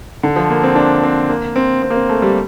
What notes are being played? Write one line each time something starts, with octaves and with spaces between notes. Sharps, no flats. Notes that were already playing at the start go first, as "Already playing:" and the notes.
D3
F3
A#3
C4
D4
C4
A#3
C4
C4
A#3
C4
A3
G3